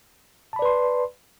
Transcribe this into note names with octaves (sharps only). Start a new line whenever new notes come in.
B4 D5 A5 B5 C6